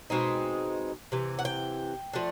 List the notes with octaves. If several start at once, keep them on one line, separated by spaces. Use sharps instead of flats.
B2 G#3 C4 D#4
C3 E3
F#5
G5
F3 A3 D4